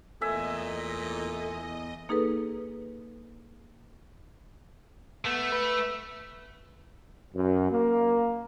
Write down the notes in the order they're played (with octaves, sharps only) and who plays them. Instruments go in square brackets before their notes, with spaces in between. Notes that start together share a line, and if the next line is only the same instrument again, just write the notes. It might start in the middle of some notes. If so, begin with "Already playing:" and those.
[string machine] E2 D#5 [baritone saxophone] A#2 [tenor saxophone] A3 [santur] E5 G#5
[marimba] A#3 D#4 G#4 A4 B4
[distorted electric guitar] A3 [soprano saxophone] B3
[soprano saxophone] B4
[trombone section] F#2
A#3